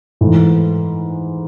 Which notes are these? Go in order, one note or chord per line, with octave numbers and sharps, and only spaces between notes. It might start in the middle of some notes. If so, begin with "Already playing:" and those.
G#2 E3 A3